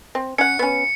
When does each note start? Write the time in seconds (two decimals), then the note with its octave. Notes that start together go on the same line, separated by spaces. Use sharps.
0.15 C4
0.38 C#4 F#5 C#7
0.59 B3 C#4